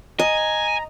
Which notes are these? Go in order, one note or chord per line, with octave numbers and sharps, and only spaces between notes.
D#5 G#5 A#5